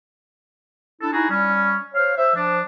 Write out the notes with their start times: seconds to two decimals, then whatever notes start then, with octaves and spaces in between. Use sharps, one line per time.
1.01 D4 E4 A4
1.13 D#4 E4 F#4 G#4
1.30 G3 C#4
1.94 C5 C#5 F5
2.17 C5 E5
2.35 F3 D4